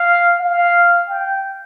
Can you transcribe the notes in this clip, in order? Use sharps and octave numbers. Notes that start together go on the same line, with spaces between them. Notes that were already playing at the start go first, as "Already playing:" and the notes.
Already playing: F5
F5
G5